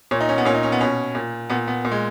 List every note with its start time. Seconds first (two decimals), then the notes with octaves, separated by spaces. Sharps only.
0.11 A#2 C#5
0.21 D#4
0.29 C#4
0.38 B3
0.45 A#2 C#4
0.55 D#4
0.63 C#4
0.72 B3
0.81 B2 C#4
1.15 A#2
1.50 A#2 B3
1.68 B3
1.85 A#2
1.92 G#3